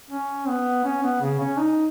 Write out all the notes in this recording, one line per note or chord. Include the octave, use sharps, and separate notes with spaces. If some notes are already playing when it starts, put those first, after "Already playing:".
C#4
B3
C#4
B3
C#3
C#4
D#4